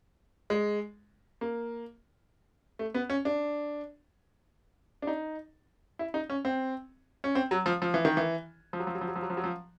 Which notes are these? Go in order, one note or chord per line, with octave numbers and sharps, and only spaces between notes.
G#3
A#3
A3
B3
C#4
D4
D4
D#4
E4
D#4
C#4
C4
C#4
C4
F#3
F3
F3
E3
D#3
E3
F3
F#3
F3
F#3
F3
F#3
F3
F#3
F3
F#3
F3